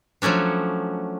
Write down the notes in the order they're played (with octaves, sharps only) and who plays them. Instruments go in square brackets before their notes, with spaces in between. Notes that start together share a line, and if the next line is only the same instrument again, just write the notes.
[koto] F3 F#3 A3 C#4 D4